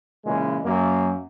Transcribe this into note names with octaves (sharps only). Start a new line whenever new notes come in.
A#2 C#3 E3 G#3
F#2 A#3